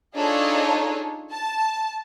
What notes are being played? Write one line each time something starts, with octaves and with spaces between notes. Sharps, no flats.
D4 D#4 F4 G#4 A4 C#5
A5